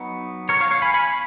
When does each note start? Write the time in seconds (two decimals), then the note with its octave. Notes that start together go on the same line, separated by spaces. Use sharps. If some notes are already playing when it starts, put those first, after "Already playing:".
Already playing: F#3 B3 D#4
0.49 A#4 C#5
0.60 C#5 F5
0.71 C#5 F5
0.82 G#5 B5
0.94 G#5 B5